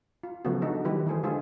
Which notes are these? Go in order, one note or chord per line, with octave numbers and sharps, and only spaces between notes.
F4
C#3 F3 F#3 A3 B3 F#4
G#3 D4 D#4 F#4 A4
D#3 F#3 G3 E4 G4 B4
E3 A3 G#4 C5
D3 G#3 F4 G#4 A4 C5